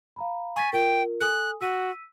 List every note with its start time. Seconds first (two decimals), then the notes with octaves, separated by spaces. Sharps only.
0.16 F5 A#5 B5
0.56 G#5 C#6 A6 B6
0.73 F4 A#4 G5
1.20 A4 G#5 D#6 F#6
1.61 F#4 E6 B6 D#7